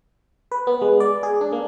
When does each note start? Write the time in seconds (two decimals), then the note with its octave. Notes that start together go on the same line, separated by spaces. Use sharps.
0.51 B4
0.67 B3
0.82 G#3
1.00 D5
1.23 G#4
1.41 D4
1.52 A#3